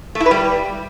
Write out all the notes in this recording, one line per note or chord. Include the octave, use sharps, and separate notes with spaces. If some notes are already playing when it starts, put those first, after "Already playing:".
A3
E4
B4
G3